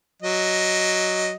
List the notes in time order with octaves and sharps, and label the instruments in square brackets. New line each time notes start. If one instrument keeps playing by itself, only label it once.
[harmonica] F#3 D#5